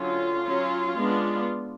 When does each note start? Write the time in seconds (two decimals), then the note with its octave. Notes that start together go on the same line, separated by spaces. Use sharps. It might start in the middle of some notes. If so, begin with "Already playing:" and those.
Already playing: D3 F#3 C#4 F4
0.45 F#3 C#4
0.97 G#3 B3 D4